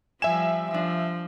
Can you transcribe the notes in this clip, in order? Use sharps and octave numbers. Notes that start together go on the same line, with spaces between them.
F3 G3 E5 G#5 E7
F3 D4 E6